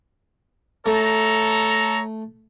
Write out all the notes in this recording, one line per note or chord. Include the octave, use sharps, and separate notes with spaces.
A3 A4 C#5 A#5